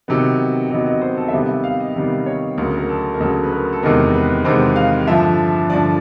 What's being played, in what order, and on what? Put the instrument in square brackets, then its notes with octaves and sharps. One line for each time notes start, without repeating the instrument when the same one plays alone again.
[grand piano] C3 D#3 F#3 B3
C3 D#3 F#3 B3 D#5
D#5
C5
A4
E5
C3 D#3 G3 B3 D#5
E5
F5
D#5
C3 D#3 G3 B3
C#5
D2 C#3 F#3 A#4
A#4
A4
A#4
D2 C#3 F#3 A4
B4
A#4
A4
E2 C3 D#3 G#3 B3 A#4
B4
E2 C3 D#3 G#3 B3 C5
F5
G2 D3 F3 E5
G2 D3 F3 D5